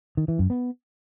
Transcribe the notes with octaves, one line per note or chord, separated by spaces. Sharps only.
D#3
E3
F#2
B3